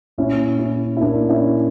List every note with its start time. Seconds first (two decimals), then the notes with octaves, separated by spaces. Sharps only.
0.18 A#2 C#4 E4
0.59 C#4 E4
0.97 E4
1.01 A#2 A#3 D4
1.29 C#4 E4